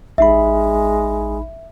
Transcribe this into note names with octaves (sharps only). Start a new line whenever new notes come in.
A1 G#3 D#4 E5 B5